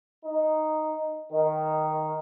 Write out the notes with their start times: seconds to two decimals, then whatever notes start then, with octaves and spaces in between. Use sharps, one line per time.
0.25 D#4
1.32 D#3